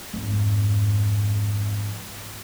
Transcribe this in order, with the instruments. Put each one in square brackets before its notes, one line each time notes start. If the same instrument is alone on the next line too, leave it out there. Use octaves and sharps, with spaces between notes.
[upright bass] F2 G#2